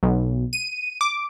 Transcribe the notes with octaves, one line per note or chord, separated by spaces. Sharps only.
B1
D#7
D6